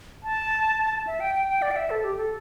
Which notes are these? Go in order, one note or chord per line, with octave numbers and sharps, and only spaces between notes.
A5
E5
G5
G5
G5
D5
G5
E5
A4
G4
A4